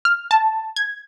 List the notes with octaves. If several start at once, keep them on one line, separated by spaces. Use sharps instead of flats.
F6
A5
G#6